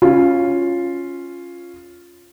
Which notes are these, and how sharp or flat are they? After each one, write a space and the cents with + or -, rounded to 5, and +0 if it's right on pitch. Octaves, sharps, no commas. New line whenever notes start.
C#4 +0 F4 +0